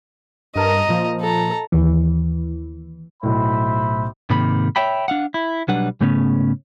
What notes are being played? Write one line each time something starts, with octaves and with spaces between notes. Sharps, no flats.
G2 A#4 D#5 A5 A#5
A#2 F3
A4 A#5
D#2 E3
B1 A2 C5 E5 B5
G#2 C3 D#3 A#3 B5
C#5 E5 G5 B5
D4 F5 F#5
E4
B1 F#3 G3 D4 B4 F#5
G#2 C#3 A3 B3 C#4